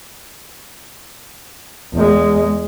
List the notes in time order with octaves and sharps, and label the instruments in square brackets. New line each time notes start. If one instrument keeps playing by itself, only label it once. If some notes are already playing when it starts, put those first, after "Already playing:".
[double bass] E2 G#3